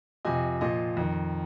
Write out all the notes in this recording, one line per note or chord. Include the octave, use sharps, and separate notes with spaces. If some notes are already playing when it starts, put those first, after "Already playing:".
F2 C3 F3 D#5 G#5
A#2 F3 D#5
F2 D#3